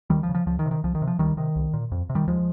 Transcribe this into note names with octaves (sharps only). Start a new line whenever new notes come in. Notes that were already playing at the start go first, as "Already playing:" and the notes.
D#2 D#3 G3
F3
C#3
F3
C#2 F3
D#3
C3
D#3
C2 F3
D#3
C3
F3
C#2 D#3 G3
C3 D#3
C2
A#2
F2
C3
D#3 G3
D#2 F3 G#3